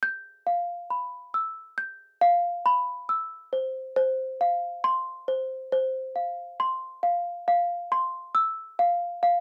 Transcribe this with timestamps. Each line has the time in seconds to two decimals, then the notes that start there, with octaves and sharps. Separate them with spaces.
0.03 G6
0.47 F5
0.90 B5
1.34 E6
1.78 G6
2.21 F5
2.66 B5
3.09 E6
3.53 C5
3.96 C5
4.41 F5
4.84 C6
5.28 C5
5.72 C5
6.16 F5
6.60 C6
7.03 F5
7.48 F5
7.92 C6
8.35 E6
8.79 F5
9.23 F5